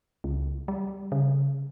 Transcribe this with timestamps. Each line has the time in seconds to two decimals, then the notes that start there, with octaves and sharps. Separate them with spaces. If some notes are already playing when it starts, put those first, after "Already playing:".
0.24 C#2
0.68 G3
1.12 C#3